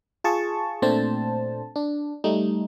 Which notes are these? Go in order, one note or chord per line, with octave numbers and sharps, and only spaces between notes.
F4 G#4 A5 C#6
A#2 A3 C4 D4 C5 A5
D4
G3 A3 D#4